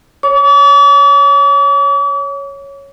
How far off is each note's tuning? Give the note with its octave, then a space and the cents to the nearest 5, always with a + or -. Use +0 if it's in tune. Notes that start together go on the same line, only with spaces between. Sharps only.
C#5 +0 D6 -45